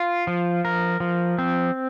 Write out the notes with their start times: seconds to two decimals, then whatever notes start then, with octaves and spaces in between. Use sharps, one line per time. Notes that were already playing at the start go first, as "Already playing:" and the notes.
Already playing: F4
0.27 F3
0.65 A#4
1.00 F3
1.38 C4